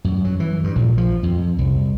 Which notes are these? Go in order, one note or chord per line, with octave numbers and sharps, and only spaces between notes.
F#2
F#3
E3
G2
A#1
F3
F2
C2